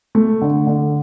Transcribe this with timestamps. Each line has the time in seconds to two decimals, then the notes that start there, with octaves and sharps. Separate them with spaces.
0.15 A3
0.42 D3
0.67 D3